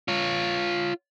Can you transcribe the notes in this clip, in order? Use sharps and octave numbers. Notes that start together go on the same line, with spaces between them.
F4 C#5